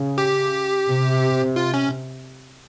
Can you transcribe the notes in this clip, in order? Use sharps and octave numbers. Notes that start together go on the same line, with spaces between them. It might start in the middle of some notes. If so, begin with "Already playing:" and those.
Already playing: C#3
G4
C3
F4
C#4